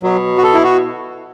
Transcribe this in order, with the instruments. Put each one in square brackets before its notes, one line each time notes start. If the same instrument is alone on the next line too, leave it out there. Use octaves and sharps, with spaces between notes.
[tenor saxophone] B2 [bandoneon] F#3
[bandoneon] F#4
A4
E4
F#4